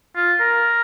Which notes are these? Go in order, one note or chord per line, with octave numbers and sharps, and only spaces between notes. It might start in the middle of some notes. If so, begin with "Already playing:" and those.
F4
A#4